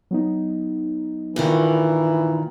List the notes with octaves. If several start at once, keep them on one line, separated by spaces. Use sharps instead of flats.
F#3 B3 D#4
G2 A#2 D#3 E3 F4